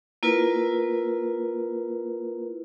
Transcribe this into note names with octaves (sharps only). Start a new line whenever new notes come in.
A#3 E4 F4 A#4 B4